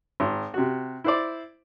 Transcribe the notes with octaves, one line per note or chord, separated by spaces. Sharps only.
G#1
C3 F#4
E4 C5 D5